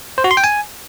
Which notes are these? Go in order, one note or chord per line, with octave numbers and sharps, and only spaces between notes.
C5
F#4
C6
G5
G#5